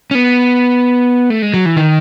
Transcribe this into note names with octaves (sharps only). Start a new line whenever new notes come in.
C#4
B3
A3
G#3
F#3
E3
D#3